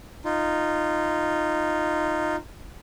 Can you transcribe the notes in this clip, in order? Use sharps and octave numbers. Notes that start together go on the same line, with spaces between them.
D#4 F4